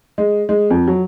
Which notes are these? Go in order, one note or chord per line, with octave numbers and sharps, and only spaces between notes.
G#3
G#3
F2
F#3